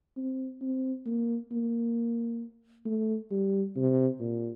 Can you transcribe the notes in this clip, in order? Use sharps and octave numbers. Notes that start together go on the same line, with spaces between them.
C4
C4
A#3
A#3
A3
G3
C3
A#2